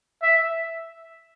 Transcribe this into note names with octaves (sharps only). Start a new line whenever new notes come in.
E5